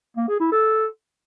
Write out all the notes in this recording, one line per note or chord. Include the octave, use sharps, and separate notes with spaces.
A#3
G#4
E4
A4